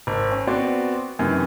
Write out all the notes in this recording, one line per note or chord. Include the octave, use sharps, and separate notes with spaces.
G#1
C#4
B3 C4 F#4 B4 D5
F#2 C3 D#3 E3